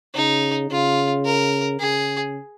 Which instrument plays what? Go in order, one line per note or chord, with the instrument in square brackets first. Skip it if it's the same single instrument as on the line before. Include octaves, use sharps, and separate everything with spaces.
[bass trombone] C#3 [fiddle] D#4
[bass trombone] C#3 [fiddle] F4
[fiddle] A#4
[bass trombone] C#3 [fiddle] G#4